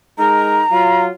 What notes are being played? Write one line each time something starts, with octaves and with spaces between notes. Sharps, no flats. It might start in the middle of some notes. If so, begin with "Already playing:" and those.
G#3 D#4 A#4 A#5
F#3 F4